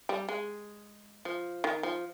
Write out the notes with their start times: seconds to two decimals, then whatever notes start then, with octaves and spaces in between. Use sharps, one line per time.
0.09 G3
0.29 G#3
1.25 F3
1.64 D#3
1.83 F3